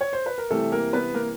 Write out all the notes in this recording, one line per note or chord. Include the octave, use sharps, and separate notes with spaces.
C#5
C5
B4
A#4
C3 E3 G3 A3 A4
A#3 A#4
B3 B4
A#3 A#4